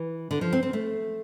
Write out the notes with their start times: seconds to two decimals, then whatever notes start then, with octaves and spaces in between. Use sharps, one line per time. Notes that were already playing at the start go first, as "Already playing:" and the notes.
Already playing: E3
0.31 D3
0.41 F3
0.53 C4
0.63 C4
0.73 A3